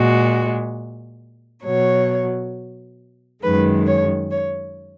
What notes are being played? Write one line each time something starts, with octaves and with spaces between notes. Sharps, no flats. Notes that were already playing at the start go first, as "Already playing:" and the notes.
Already playing: A#2 G#3 F#4
B2 F#3 C#5
F#2 D#3 G#3 B4
C#5
C#5